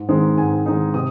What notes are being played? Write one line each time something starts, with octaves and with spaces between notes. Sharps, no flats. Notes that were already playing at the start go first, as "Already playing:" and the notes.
Already playing: G#2
D#3 G#3 C4 D#4
G#2 G#5
D#3 G#3 C4 D#4
C3 D#6